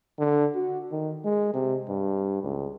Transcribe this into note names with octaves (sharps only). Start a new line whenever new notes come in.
D3
F#4
D#3
G#3
C3
G2
C#2